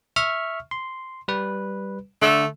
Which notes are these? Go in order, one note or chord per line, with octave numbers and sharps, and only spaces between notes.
E5 C#6 F6
C6
G3 B4
D3 A3 E6